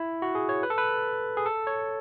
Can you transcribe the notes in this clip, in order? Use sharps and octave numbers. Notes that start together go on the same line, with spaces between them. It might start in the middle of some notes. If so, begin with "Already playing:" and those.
Already playing: E4
F#4
G#4
C#5
B4
A4
B4
G#4
A4
C#5